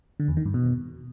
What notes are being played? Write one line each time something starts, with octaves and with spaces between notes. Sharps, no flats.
D3
E2
D#3
G2
B2